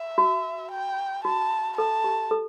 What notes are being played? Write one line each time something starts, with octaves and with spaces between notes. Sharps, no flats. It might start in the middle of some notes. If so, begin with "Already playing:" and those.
Already playing: E5
F#4
G5
F#4 A5
A4 A5
G4
A4